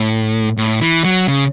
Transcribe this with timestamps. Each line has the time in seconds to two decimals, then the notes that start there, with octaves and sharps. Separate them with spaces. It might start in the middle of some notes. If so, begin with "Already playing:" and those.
Already playing: A2
0.57 A2
0.81 E3
1.04 F#3
1.28 C#3